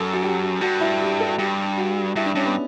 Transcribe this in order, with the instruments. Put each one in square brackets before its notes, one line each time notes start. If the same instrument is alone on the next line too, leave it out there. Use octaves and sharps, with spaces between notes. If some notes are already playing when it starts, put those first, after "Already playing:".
Already playing: [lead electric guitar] F#2 [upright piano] A4
[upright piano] F#4
G4
[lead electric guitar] G2 [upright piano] F#4
[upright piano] E4
G4
A4
F#4
[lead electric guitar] G2 [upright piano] G4
[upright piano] F#4
[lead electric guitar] G2 [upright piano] E4
[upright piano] D4
[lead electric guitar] G2 [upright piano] C#4
[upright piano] B3